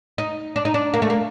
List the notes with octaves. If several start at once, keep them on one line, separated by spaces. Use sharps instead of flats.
D#4
D4
D#4
D4
A#3
A3
A#3